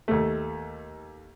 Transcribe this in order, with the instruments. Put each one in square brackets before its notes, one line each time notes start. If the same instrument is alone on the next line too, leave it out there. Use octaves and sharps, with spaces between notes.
[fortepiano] D#2 A3